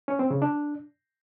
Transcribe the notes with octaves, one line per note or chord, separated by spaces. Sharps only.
C#4
C4
C#3
D4